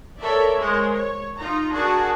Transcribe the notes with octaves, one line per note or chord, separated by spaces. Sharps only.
A4 A#4 C#5 D5 E5
G#3 A#4 C5 C#5
C#5
D#4 F4 A#5
D4 F#4 G#4 A#4 A5